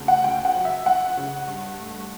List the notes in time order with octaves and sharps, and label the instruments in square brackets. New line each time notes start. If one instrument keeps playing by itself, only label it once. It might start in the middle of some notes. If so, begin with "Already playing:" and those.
Already playing: [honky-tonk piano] D2 C#3
F#5
C#2 G5
F#5
F#3
E5
C#2 F#5
C#3
G2
A3